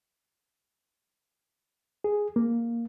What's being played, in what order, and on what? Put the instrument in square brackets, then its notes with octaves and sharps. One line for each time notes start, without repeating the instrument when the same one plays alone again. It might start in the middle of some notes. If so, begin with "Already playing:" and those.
[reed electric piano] G#4
A#3